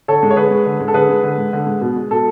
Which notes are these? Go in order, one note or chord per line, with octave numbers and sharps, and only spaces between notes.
D3 A4 C#5
G#3
C#5
D3 G#4 B4
G#3
D3
G#3
A4
D3 G#4 B4
G#3
D3
G#3
D3
G#3
B2
G#3
B2 A4